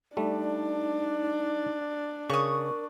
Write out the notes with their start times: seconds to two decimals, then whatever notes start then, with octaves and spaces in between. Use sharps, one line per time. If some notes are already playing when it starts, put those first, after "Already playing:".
0.17 G3 A3 D4 D#4
2.30 C#3 A#4 C#6 D#6